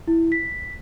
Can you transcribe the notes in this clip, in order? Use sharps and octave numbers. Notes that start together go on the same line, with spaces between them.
E4
B6